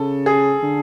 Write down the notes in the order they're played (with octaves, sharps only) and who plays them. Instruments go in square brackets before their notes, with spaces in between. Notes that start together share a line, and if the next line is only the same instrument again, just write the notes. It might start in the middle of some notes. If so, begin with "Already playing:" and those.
Already playing: [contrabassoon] C#3 [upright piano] A4
[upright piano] G#4
[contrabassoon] D3